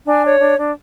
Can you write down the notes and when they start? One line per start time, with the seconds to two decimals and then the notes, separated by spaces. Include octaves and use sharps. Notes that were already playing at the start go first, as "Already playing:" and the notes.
0.06 D4 G#5
0.23 C#5
0.40 D4
0.58 D4